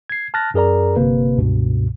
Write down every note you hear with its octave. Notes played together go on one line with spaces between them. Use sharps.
G#6 C7
A5 F6 F#6 A6 A#6
F#2 G#4 A#4 D5 A#5
G1 C3 A#3 B4
C#2 G2 B2